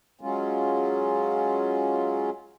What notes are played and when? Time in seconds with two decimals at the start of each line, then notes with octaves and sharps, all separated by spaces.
0.21 F#3 G#3 C#4 F4